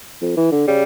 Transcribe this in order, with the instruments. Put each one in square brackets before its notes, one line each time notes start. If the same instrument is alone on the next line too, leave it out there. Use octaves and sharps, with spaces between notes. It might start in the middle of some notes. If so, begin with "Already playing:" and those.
[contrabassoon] F2
E3
D3
[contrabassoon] C#3 [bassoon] G3